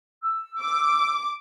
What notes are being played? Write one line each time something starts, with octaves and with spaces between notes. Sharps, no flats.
E6
D6